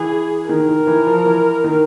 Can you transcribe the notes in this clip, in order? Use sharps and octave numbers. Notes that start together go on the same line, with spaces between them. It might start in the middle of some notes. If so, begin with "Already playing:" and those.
Already playing: E3 G#4
D#3 A#4
D#3
E3
F3
E3
D#3